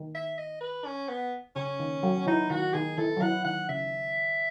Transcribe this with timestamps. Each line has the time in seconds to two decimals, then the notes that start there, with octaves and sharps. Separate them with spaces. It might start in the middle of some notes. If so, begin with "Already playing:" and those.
Already playing: D#3
0.15 E5
0.38 D#5
0.61 B4
0.85 C#4
1.09 B3
1.56 C#3 C#4
1.80 D#3
2.03 F#3
2.26 E3 D#4
2.50 D#3 F#4
2.73 D#3 G#4
2.98 E3 A4
3.17 F#3
3.21 E3 F#5
3.45 D#3 F#5
3.69 C#3 E5